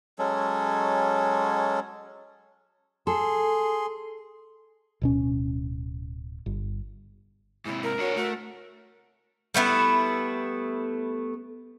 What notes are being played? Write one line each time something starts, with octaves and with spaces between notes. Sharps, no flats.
F#3 G#3 C#4 A4
G#4 A4 C6
D1 B2 C#4
G1
G#2 C3 E4
A#4
D4 F#4 C#5
A3 F#4
G3 A3 B3 E4